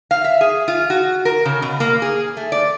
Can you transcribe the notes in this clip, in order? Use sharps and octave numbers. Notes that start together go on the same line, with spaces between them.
F5
E5
G#4
F4
F#4
A#4
C#3
B2
A#3
G#4
A3
D5